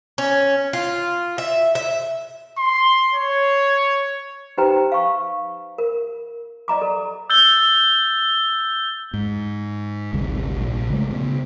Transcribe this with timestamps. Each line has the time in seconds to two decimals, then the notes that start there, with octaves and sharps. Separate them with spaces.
0.18 C#4
0.73 F4
1.38 E5
1.75 E5
2.59 C6
3.14 C#5
4.58 D#4 G4 B4 C5 G5 A#5
4.92 F5 C#6
5.78 A#4
6.68 D5 D#5 A#5 D6
6.81 A4
7.30 E6 G6 A6 G7
9.14 G#2
10.13 G#1 D2 C3 G3
10.57 A#1
10.90 C#3 G#3 A3
11.11 C#3 B3